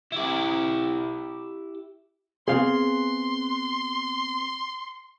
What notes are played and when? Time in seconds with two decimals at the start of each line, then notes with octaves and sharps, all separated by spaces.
0.12 E4 G4
2.48 B3 C4 G#4 F5 C6